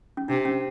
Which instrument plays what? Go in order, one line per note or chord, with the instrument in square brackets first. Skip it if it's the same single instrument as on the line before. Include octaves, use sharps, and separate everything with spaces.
[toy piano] C#4
[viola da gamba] C3 [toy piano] D4
[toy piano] C#4